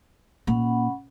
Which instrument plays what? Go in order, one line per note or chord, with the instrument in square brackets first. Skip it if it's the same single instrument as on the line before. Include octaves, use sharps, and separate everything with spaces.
[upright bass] A#2 [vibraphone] C#4 F#5 B5